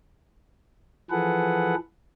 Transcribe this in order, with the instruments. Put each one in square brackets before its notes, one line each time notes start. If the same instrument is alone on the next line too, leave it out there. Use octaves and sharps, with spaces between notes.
[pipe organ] E3 F3 G#4 A4 B4 F#5